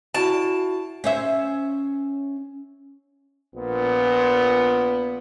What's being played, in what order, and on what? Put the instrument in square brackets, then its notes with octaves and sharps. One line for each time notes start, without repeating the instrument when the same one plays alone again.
[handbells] E4 F#4 D7 [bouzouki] A5
[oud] C#4 C5 E5
[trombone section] A#1 A#2 B3